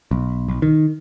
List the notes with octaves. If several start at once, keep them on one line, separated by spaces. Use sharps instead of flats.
B1
B1
D#3